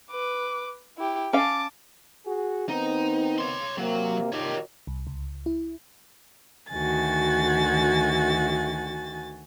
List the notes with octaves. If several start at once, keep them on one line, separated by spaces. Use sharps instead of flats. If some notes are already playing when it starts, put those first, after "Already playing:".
B4 D6
E4 G4
C#4 F5 A5 D6
F#4 G#4
D#3 B3 C4 D#4
C#5 C6
C3 F#3 A#3
A#2 D#3 G4 C#5
C2
C#2
E4
D2 D#3 F#4 G#5 A6